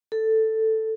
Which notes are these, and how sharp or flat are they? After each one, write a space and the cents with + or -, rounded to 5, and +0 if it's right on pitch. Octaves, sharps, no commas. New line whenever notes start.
A4 +5